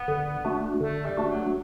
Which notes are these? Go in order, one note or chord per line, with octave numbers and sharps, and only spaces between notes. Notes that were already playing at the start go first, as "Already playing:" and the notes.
Already playing: B3
D3
A3 D4 F#4
D3 A3
G3
A3 D4 F#4
F#3